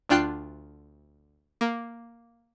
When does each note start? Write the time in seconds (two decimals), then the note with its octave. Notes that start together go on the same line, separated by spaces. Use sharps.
0.09 D2 D4 F4 G5 F#6 C7
1.61 A#3